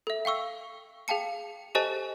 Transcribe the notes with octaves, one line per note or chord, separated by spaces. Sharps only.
A4 E5
F5 G5 C#6 E6
G#4 F5 G5 A5 C#7
G4 A4 C5 D#5 G#5 A5